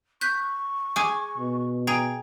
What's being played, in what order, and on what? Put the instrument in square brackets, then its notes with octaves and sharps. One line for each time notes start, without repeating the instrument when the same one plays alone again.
[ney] C#6 [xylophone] F#6 G6 B6
[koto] G#4 G#5 [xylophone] D6
[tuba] B2
[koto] G#4 [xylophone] G5 A#5 D7